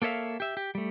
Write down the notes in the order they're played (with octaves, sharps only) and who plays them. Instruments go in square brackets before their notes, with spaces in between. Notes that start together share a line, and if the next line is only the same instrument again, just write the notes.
[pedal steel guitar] A#3 A4 C#5 E5 F5
G4 E5
G4
G3 A3